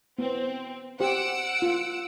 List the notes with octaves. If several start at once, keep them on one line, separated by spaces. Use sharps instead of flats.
B3 C4
G4 C5 F#5 E6 D7
F4